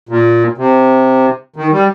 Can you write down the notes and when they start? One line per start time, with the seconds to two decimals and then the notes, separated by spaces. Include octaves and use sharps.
0.09 A#2
0.58 C3
1.56 D#3
1.73 G3